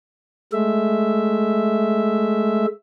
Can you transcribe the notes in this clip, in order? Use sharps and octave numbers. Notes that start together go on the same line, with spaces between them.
G#3 A3 E5